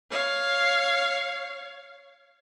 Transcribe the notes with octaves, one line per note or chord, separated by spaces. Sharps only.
C#5 F5